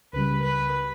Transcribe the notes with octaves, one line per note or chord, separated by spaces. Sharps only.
C#2 C#3 G3 B4
B4